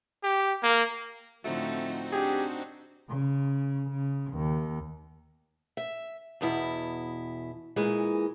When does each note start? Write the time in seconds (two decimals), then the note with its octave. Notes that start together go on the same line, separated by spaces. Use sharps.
0.23 G4
0.63 A#3
1.44 A2 D3 F3 A3 C4 D#4 F#4
2.12 D4 G4 G#4
3.08 C#3
3.90 C#3
4.33 D#2
5.77 E5
6.41 E2 B2 E4
7.76 A#2 E3 G#3